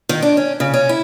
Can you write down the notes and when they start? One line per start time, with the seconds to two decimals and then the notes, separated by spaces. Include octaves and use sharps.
0.09 D#3
0.22 D4
0.37 C#4
0.60 C#3
0.74 C#4
0.89 E4